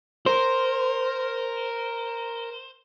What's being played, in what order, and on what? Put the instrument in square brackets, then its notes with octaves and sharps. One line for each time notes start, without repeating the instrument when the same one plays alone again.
[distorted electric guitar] A#4 [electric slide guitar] C5